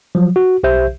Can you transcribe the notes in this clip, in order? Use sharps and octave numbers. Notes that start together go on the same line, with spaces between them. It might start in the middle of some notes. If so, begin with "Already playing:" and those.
F3 F#3
F#4
B1 G4 C5 E5 G6